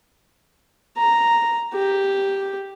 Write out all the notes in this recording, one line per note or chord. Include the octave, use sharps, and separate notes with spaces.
A#5
G4